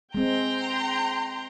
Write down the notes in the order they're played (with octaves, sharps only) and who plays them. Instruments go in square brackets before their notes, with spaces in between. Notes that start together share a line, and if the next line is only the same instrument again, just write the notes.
[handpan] G#3 C4 [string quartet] G5 A#5 C6